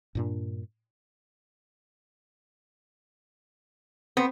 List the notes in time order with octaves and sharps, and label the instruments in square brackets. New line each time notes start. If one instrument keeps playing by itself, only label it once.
[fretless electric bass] G2 A#2 D4
[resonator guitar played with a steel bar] B3 [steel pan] C4 C5